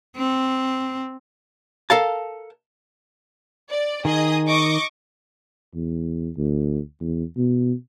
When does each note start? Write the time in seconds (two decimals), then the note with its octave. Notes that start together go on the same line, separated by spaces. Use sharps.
0.16 C4
1.90 A4 A#4 F5 A5
3.70 D5
4.05 D#3 G#4 D#5 D#6
4.47 D#5 C#6 D6
5.75 E2
6.37 D2
7.01 E2
7.37 B2